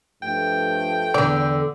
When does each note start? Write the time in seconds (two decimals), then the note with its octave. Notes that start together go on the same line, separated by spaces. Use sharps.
0.23 G2 F3 A3 G5
1.14 E2 D3 D5